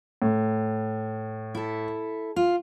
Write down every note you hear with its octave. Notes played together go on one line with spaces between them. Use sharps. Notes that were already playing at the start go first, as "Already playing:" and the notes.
A2
E4 A4
F4